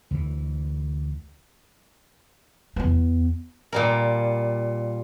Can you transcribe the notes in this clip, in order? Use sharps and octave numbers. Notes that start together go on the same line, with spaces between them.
D2 E3
E2 B3
A#2 G3 A#4